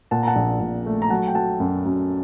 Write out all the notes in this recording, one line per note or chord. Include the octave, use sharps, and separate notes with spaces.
A#2 F#5 A5
A#5
F#5 A5
A#1
A#1
A3
A#5
F#3 F#5 A5
G5
F#3 F#5 A5
F#2
F#2